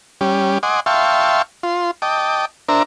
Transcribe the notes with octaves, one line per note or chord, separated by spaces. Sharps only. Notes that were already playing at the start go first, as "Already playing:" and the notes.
G3 C#4 G4
D#5 F#5 G#5 C6 D6
E5 F5 G5 A5 C6 C#6
F4 C6
D#5 G5 A5 D6
D4 A#4 C5 E5 A#5